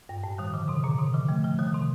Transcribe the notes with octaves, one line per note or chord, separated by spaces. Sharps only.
G2
A2
D#3 G3
D3 F3
C3 D#3
A#2 D3
C3 D#3
D3 F3
F3 A3
F3 A3
D#3 G3
C3 D#3